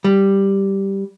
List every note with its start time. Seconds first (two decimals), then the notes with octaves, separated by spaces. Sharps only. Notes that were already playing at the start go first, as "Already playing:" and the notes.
0.04 G3